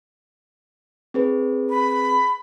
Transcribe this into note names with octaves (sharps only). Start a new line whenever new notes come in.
C4 G#4 B4
B5